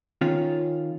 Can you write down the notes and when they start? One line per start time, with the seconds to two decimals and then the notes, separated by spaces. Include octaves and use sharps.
0.21 D#3 C#4 F4